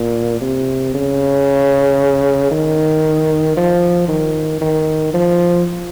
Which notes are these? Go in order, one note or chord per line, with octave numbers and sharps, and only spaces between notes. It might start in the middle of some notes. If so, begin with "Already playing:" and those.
Already playing: A#2
C3
C#3
D#3
F3
D#3
D#3
F3